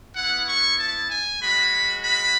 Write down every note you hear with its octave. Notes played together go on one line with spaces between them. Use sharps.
B3 E4 F#5
C#6
A5
G#5
G#3 C#4 F#4 B5
B5